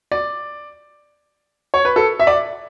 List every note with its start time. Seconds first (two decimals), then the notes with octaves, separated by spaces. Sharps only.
0.12 D5
1.74 C#5
1.85 B4
1.96 A4
2.20 E5
2.27 D5